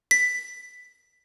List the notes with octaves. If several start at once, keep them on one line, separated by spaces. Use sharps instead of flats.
B6